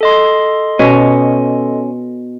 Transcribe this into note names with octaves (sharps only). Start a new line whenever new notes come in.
A4 D#5 C6
B2 C#4